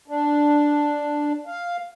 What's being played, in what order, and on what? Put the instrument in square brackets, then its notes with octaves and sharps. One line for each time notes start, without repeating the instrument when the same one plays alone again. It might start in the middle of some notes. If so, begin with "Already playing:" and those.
[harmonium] D4
F5